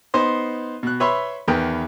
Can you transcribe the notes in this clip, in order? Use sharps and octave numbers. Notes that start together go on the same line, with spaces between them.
B3 D#4 C5 C6
B2 F#6
B4 C#5 E5 B5 C6
E2 D#3 B4 G5 B5